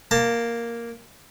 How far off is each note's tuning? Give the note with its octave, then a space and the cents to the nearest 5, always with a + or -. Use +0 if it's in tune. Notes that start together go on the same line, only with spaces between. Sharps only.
A#3 +0 A5 +25